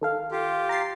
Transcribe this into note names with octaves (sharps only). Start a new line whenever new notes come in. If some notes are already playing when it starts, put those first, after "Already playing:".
D#3 A4 F5
F4 G4
A#5 A6 C7